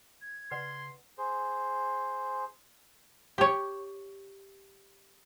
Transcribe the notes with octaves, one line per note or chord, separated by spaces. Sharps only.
G#6
C#3 B4 D5 F#5 C6
G#4 C5
G4 C#5